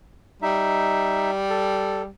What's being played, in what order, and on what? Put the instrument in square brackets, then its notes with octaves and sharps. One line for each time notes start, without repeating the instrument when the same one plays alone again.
[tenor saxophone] G3 [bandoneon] D#4 E5
[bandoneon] A4